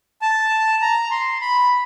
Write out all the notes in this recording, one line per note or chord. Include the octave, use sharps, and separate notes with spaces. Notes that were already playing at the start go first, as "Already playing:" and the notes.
A5
A#5
C6
B5